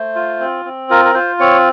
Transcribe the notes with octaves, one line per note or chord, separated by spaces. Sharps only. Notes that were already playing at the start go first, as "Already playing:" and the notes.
Already playing: A3 C5
F4
C4
C4
F4 A#4
A#4
F4 C5
C4 C#5